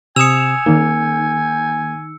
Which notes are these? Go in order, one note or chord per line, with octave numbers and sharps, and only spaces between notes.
C3 G#5 D#6 E6 C#7 E7 F7
D#3 A#3 D#4